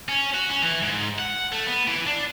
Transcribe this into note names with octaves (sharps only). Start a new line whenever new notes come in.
C#4
F#4
C#4
E3
G#2
F#5
A3
B3
E3
D4